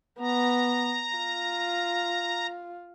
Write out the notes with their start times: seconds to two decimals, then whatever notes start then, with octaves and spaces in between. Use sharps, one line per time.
0.20 B3 A#5
1.16 F4